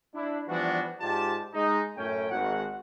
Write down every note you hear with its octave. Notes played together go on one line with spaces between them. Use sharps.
D4 E4
E3 F3 G3 B3 D4 F#4
G#2 F4 G4 D5 A5
G#3 D#4
F#2 A2 A3 C#4 G5
G#1 F#4 F#5